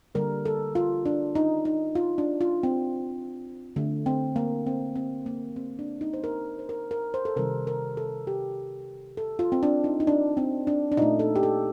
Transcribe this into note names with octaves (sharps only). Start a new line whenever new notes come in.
D3 G3 A#3 A#4
A4
F4
D4
D#4
D#4
F4
D4
F4
C4
D3 A3
C4
A#3
C4
C4
A#3
C4
D4
D#4
C5
A#4
C5
A#4
A#4
C5
A4
C3 D#3 G3 A#4
A#4
A4
G4
A4
F4
C4
D4
D#4
D#4
D4
C4
D4
D4
A#2 A3 D#4
A4
G4
A4